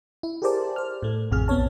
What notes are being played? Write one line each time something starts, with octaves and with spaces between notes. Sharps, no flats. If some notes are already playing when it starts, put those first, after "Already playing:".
E4
G4 G#4 A#4 C5 D5 A5
C5 F6
A2 A3
A1 F2 C3 G#4 F6
B1 B3 C4 C#5 A5